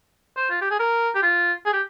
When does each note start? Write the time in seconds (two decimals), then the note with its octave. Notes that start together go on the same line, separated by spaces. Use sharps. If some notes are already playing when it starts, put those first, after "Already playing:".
0.37 C5
0.50 F4
0.61 G4
0.71 G#4
0.80 A#4
1.15 G4
1.23 F4
1.65 G#4
1.73 G4